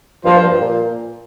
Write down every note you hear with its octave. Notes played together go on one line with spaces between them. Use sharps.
G2 F3 A#3 F4 C5
G2
A#2